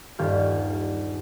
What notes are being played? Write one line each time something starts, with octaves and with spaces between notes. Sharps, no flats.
D#1 G2 G4 F6